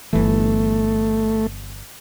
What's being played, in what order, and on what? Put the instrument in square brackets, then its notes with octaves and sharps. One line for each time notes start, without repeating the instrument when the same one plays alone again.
[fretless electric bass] G1 E3 [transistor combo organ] A3